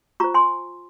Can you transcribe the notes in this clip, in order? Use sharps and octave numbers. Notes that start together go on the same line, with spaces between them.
F4 C5 A#5 C#6
G#5 C6